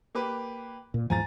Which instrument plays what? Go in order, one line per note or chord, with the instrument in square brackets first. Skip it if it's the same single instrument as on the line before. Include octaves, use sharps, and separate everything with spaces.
[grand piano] A#3 G4 B4
[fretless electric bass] A#2
[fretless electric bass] E2 G#2 F3 [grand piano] G#5 A#5 A6